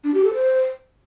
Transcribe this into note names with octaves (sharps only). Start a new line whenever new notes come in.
D4
G4
A4
C5